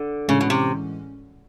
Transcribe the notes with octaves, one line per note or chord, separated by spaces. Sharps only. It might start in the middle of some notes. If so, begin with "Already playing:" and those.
Already playing: D3
A2 C#3 E3 G#3 C#4
B2
C3